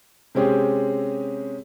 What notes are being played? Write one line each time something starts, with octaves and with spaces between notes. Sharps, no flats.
C3 G#3 C4 C#4 G4 G#4